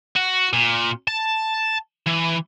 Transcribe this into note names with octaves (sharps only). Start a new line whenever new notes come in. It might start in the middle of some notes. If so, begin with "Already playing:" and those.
F#4
A#2
A5
E3